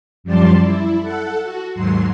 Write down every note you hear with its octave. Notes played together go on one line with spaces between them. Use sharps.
F#2 F3 G3 D5 A5 C6
E4
A4 F#5
F#4
D#2 G#2 F#3 C6